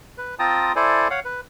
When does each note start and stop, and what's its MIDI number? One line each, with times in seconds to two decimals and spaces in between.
0.18 0.35 71
0.39 0.73 60
0.39 0.73 65
0.39 0.73 79
0.39 0.73 81
0.39 0.73 82
0.39 0.73 87
0.76 1.08 64
0.76 1.08 69
0.76 1.08 72
0.76 1.08 74
0.76 1.08 80
1.10 1.20 73
1.10 1.20 77
1.10 1.20 78
1.25 1.41 71